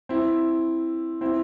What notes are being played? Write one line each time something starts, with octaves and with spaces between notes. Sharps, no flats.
C4 E4
C4 E4